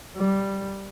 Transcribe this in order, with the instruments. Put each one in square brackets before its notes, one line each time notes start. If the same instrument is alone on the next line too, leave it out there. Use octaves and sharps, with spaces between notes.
[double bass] G3